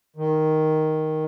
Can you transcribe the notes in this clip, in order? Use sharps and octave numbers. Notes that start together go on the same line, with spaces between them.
D#3